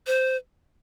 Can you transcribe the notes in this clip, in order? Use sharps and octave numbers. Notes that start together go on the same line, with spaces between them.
C5